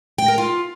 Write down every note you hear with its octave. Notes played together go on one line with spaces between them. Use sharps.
G5
A#4
F4